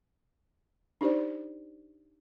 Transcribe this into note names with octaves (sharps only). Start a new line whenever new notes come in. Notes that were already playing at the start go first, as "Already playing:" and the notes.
D4 D#4 G4 C5 D5